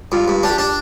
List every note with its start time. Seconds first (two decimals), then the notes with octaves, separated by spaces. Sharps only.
0.12 G2 F4
0.28 G2
0.43 D4 G4
0.58 D4